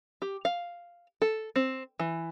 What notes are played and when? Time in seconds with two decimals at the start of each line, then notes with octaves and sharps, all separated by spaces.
0.22 G4
0.45 F5
1.22 A4
1.56 C4
2.00 E3